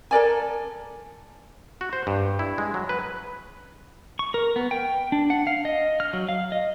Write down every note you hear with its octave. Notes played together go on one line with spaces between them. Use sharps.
A4 A#4 D5 G#5
F#4
C5
G2
E4
G#3
F#3
B4
C#6
A#4
B3
G5
D4
F#5
F5
D#5
F6
F#3
F5
D#5